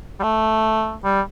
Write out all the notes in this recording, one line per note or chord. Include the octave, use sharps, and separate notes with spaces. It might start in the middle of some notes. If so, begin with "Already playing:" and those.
G3
A3
G3